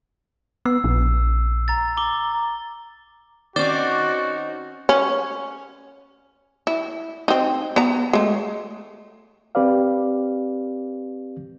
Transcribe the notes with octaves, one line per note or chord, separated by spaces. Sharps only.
B3 E6 C7
A#1
A#5 A6
A#5 D6 G7
D#3 C4 C#4 F#4 C5 D5
C#4
E4
C4 D#4
B3 A#5
G#3 A3
C4 G4 B4 D5 F5